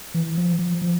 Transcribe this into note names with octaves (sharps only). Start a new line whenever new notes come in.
E3
F3
F3
F3